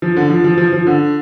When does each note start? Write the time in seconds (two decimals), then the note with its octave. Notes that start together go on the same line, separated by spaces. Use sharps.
0.02 F3
0.16 D3
0.29 F3
0.44 F3
0.58 F3
0.72 F3
0.87 D3